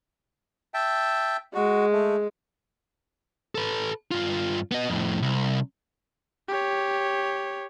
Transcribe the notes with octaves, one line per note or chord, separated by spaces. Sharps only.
E5 G5 A5
G#3 F#4
A3
A4 B4
G2 F4
B3 D#5
F2 A2
C2
G4 C#5